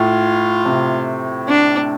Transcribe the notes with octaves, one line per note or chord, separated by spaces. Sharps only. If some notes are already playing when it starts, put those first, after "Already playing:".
Already playing: A2 F4
C3
D4